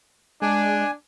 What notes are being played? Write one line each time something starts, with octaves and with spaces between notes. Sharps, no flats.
G#3 D4 G#5